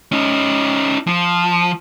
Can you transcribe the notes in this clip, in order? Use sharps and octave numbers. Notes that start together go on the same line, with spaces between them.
C#4 D#4
F3